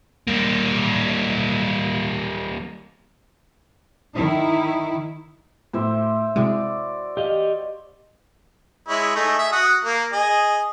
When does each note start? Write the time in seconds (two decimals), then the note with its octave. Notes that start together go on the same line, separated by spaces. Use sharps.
0.28 G3 A#3
4.13 D#3 E4
5.73 A2 G4 C5 E5
6.36 C3 G#3 E4 F#4 D5 D6
7.17 G4 D#5 F5
8.89 G#3 E4 C#5
9.15 A3 D#4 G#4
9.39 G#4 E5
9.52 F#4 F#5 D#6
9.85 A#3
10.13 G#4 D#5